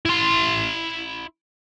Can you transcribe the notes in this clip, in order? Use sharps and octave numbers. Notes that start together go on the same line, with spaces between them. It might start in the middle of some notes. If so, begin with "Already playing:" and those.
E4 C6